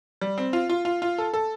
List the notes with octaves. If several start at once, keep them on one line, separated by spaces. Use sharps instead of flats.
G3
C4
F4
F4
F4
F4
A4
A4